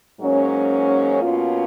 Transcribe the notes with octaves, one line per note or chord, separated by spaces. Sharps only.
G#2 F#3 A#3 C#4
B2 A#3 C#4 F4